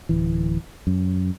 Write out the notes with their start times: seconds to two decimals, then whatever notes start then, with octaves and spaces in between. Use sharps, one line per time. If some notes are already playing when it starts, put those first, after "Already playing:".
0.09 D1 E3
0.87 F#2